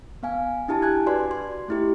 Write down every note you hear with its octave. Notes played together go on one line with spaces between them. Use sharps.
B3 F5 G#5
D4 E4 G4 A5
G#5 F#6 G#6
F#4 B4 D5 C6
C6
A3 E4 G4